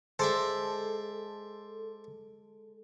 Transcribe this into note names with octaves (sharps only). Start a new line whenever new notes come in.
G#3 A4 C5 D5 E5